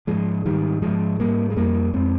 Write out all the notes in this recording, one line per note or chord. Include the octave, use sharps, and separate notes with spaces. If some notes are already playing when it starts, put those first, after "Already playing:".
G#2 F3 G#3
G#2 D#3 G3
G#2 F3 G#3
G#2 G3 A#3
G#3
F2 G3 A#3
F2 G#3 C4